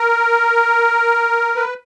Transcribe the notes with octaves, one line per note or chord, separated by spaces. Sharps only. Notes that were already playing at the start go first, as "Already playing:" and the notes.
Already playing: A#4
B4